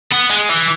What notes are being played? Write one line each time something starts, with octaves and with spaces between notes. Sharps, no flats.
B3
G#3
E3